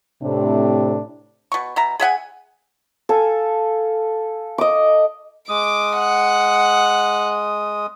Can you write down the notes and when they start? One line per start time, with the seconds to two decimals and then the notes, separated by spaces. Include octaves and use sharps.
0.23 A2 C3 D4
1.52 B2 C#6
1.76 B2 E5 A#5
2.00 G#4 E5 F#5 G#5
3.09 A4 F5 G#5
4.58 D#5 D6
5.49 G#3 D6 D#6
5.99 F#5